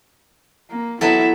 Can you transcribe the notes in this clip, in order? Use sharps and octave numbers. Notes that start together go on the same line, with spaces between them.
A#3
F#3 B3 E4 A4 E5